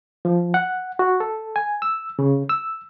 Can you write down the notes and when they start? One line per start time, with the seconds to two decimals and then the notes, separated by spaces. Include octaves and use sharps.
0.25 F3
0.54 F#5
0.99 F#4
1.20 A4
1.56 G#5
1.82 E6
2.19 C#3
2.49 E6